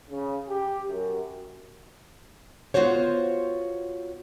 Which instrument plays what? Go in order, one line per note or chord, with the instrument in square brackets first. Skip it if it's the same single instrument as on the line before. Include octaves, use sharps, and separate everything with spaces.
[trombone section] C#3
G4
F#2
[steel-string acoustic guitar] B3 F4 F#4 C5 C#5